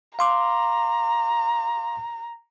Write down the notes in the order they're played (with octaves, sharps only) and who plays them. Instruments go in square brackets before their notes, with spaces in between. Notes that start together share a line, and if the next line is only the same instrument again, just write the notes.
[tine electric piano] F5 C6 D6 [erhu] A#5